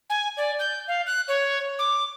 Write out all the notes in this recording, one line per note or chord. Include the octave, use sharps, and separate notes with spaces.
G#5
D5
G6
F5
F#6
C#5
D6